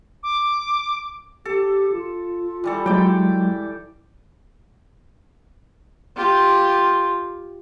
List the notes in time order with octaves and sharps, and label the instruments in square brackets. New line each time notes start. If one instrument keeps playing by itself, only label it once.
[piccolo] D6
[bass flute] G4 [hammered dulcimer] A4
[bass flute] F4
[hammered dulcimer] E3 G3 A4
[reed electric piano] F#3 G#3 [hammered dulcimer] D5 G5
[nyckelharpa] F4 G4